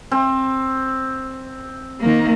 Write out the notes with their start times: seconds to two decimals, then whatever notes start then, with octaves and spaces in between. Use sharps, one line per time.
0.12 C4
2.00 D#3 A#3